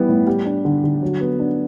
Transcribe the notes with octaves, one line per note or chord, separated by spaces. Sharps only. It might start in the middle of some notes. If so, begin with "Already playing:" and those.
Already playing: E3 G3 B3
A2
G3
D4
D3
D3
F#3
B3
D4